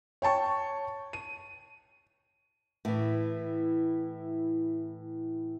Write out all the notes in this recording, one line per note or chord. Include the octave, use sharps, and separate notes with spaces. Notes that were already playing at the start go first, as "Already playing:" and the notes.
C#5 G5 A5 C#6
D#7
A2 E3